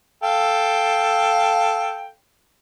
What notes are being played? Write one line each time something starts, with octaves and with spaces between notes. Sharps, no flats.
A4 F5 G5